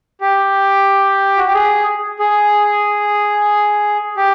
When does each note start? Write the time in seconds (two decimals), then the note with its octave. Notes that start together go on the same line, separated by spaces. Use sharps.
0.21 G4
1.37 F#4
1.45 G4
1.53 G#4
2.19 G#4
4.17 G4